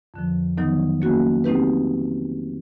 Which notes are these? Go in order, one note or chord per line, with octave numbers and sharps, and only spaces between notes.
F2 D3 F3
D#3 F#3 B3 D#4
F#3 A#3 C#4 F#4
A3 C4 D#4 G4 B4